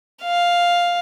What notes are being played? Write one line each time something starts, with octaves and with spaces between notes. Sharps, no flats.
F5